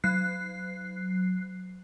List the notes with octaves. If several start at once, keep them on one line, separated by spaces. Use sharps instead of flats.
F#3 F#6 C7